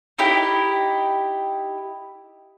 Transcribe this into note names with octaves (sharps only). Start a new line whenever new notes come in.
D#4 E4 G4 G5